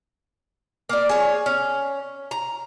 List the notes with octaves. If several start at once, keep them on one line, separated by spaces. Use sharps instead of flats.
A#3 D5
G#4 C#5
C#4
A#5